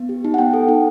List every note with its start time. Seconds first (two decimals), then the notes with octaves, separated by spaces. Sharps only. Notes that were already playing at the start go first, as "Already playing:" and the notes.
Already playing: B3
0.09 G4
0.25 D#4
0.34 F#5
0.38 B3 G5
0.53 A4
0.68 D#4